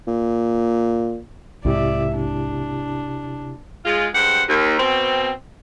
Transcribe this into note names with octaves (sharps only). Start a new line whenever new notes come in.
A#2
B1 G#2 C3 G#3 E4 G4 D5 E5
D4
G#3 F4
G2 G#3 G4 C5 F#5
D#2
B2 C4